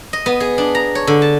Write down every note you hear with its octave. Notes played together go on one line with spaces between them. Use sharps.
D#5
B3
G#4
D4
A#5
C#5
D3
A5